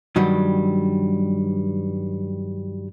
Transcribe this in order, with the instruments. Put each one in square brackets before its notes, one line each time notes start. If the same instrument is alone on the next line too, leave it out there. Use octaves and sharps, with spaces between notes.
[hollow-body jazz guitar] G2 D#3 F#3 G3